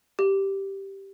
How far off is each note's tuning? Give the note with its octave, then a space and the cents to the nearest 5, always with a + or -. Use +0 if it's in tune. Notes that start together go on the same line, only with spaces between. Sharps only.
G4 -5